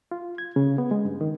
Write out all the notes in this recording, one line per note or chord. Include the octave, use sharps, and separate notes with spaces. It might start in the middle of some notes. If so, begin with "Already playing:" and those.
F4
G#6
C#3
B3
G#3
G2
D#3